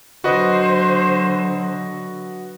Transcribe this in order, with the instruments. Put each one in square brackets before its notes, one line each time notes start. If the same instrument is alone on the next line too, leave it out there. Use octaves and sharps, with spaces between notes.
[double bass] D3 F#3 [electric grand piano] F#4 B4 D#5 [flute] C5